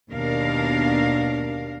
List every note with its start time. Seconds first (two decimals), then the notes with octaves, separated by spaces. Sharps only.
0.10 D#2 B2 D4 A#4 F5